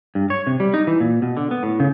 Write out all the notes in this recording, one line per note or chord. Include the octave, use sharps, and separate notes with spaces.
G2
C#5
C3
G3
D#4
E3
A#2
B2
D3
B3
A2
C#3